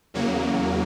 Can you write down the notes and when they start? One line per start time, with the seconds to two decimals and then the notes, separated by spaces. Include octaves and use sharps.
0.14 E2 C#3 F#3 A#3